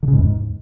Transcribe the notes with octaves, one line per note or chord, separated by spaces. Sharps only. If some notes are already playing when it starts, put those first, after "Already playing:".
D3
C#3
G#2
E2
G#2